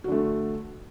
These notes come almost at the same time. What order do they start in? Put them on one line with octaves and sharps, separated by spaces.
F#4 D3 A3